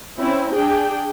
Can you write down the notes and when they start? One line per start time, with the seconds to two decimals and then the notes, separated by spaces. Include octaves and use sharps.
0.19 C4 C#4 E4
0.54 D4 G#4 G5